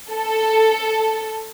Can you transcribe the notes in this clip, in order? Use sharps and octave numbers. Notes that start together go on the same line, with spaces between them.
A4